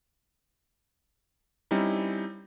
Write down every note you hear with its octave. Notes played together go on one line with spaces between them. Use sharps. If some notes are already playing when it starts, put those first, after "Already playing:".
G3 C4 C#4 D#4 E4